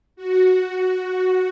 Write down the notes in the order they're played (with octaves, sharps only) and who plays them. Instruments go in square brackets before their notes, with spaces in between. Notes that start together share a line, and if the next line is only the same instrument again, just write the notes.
[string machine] F#4